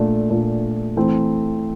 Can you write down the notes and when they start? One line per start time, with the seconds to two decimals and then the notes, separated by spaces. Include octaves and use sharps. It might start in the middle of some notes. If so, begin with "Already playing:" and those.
Already playing: A#2 A3 D4
0.30 A#2 A3 D4
0.97 E3 A3 C4